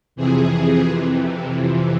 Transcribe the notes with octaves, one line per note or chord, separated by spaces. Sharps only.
F2 C3 E3 G#4